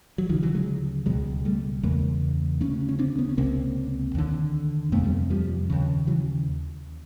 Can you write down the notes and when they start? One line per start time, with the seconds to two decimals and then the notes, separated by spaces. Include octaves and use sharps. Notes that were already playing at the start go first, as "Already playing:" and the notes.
0.18 F#3
0.29 D2 D#3 F3
0.33 C#3
0.43 E3 F#3
0.55 F#3 G#3
1.06 C#2 B2 F#3 G#3
1.45 G3 A3
1.83 E2 C#3 G#3 A#3
2.61 D2 C#3 B3 C#4
2.89 C#4
2.99 C4 D4
3.18 B3 C#4
3.29 C#4
3.38 C#2 C3 A#3 C4
4.15 D#2 D3
4.92 F2 C3 A3 B3
5.04 G3 A3
5.30 F3 G3
5.70 D#2 C#3
6.07 E3 F#3